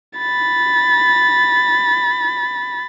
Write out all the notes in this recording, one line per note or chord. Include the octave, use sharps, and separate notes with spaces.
B5 A6